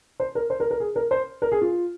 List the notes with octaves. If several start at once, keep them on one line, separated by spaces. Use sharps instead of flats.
C5
A#4
C5
A#4
A#4
G#4
A#4
C5
A#4
G#4
F4